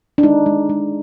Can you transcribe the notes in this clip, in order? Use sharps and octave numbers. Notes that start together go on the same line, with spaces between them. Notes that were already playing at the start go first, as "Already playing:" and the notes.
D4
G#3 D#4
G#3
G#3